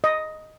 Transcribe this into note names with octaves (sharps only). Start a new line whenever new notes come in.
D#5